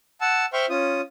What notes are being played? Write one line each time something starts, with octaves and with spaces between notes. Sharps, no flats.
F#5 A5 E6
C5 E5 G5 C6 C#6 F6
C#4 F4 D#6